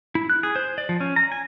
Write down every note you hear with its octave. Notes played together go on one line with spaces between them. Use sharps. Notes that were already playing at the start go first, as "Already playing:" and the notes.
E4
F#6
G#4
C5
D5
F3
C#4
A#5
G#5